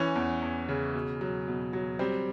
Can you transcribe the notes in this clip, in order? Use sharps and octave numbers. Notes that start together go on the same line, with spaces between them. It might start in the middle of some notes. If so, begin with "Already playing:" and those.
Already playing: E3 C#4
E2
E2
C#3
B2
F#3
B2
F#3
G3 C4